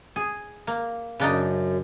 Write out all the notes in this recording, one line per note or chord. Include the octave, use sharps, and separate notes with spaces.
G#4
A#3
F#2 C#3 D4 D#4